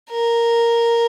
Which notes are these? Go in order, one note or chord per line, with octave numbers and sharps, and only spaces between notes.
A#4